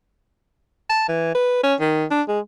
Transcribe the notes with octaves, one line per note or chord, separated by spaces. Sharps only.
A5
E3
B4
C#4
D#3
D4
G#3